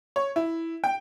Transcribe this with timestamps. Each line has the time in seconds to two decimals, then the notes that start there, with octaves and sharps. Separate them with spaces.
0.16 C#5
0.36 E4
0.84 G5